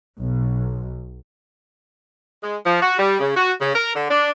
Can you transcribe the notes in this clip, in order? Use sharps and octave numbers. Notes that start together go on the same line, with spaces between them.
B1
G#3
F3
F#4
G3
C#3
F#4
C#3
A#4
D3
D4